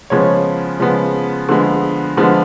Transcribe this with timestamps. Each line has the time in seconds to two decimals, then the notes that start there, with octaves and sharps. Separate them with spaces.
0.10 C#3 F3 G#3 B3 C#5
0.79 C#3 F3 G#3 B3
1.49 D3 F3 G#3 B3
2.17 D3 F3 G#3 B3